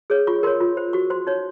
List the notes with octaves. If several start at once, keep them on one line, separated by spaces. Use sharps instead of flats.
G#4 C#5
F4 C#6
A#4 C#5 C6
F4
C5
F#4 C#6
C5 C6
D#4 C#5